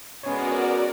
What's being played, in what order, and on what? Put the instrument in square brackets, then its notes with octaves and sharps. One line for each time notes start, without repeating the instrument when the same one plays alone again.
[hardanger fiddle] G#3 B3 [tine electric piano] C#4 C#5 [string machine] F#4 A#4 D5